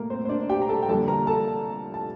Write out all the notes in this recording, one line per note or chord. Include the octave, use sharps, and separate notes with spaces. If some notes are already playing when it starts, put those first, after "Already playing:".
Already playing: A2 A3 A#3 A#4
C4 C5
C5
D4 D5
G4 G5
A#5
A4 A5
G5
F2 D3 G3 A#3 A4 A5
A#4 A#5
A4 A5
A5